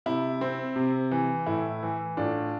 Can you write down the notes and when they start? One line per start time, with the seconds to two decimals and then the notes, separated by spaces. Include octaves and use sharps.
0.06 C3 E4
0.41 C4
0.76 C3
1.11 E3
1.46 A2 E4
1.83 E3
2.17 A2 D4 F4